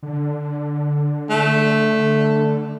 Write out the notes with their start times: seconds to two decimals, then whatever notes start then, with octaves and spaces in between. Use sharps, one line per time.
0.03 D3
1.30 A3